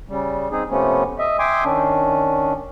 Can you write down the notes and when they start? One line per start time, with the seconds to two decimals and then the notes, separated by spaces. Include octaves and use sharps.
0.09 C#3 G3
0.52 C4 D#4 G#4
0.70 C3 F3 A3 B3 C#4
1.19 D#5 E5
1.39 E5 G5 G#5 C6 D6 D#6
1.64 D#3 C#4 D4